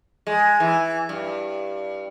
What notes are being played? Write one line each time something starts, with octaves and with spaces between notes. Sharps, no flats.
G#3
E3
G2